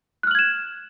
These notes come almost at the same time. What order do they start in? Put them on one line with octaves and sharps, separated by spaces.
F#6 F6 F#7 G#6 E7